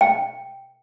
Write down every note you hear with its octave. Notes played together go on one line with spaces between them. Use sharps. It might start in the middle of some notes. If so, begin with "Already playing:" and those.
G5